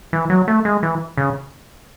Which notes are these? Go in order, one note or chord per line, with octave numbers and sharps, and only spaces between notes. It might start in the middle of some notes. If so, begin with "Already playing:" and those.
E3
F#3
A3
G#3
E3
C#3